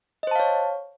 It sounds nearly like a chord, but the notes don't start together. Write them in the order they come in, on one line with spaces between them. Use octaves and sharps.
D#5 C5 A5 F5 C#5